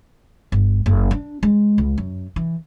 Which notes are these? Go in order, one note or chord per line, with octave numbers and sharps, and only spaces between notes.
G1
F#1
D4
G#3
C#2
F#2
E3